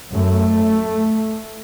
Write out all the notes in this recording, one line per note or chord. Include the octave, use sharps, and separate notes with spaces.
F#2 A3